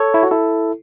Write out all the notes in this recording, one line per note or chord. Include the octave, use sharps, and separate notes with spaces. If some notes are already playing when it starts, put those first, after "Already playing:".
Already playing: A4 C#5
E4
F#4
E4 A4